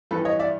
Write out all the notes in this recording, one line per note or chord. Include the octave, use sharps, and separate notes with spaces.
G2 E3 A4 B4
C#5 D#5
D5 E5